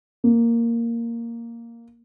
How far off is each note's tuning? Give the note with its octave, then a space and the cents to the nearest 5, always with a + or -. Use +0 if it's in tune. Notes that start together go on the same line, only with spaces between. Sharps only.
A#3 -5